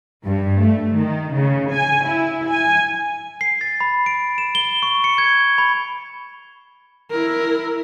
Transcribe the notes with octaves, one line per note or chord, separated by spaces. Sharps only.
G2
A3
D#3
C#3
G#5
E4
G#5
C7
A6
B5
D7
E7
G7
C#6
C#7
G#6
B5
E4 A#4